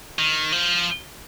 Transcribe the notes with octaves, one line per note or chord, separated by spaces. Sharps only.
D#3
F3